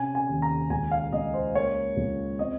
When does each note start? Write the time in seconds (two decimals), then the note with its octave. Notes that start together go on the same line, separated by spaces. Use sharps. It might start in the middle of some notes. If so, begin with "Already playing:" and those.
Already playing: C3 C#4 G#5
0.15 G#5
0.29 D#2
0.42 A#5
0.70 C#2 G#5
0.91 F5
1.12 C#2 D#5
1.34 C5
1.54 A#3 C#5
1.97 C#2
2.39 C4 D#5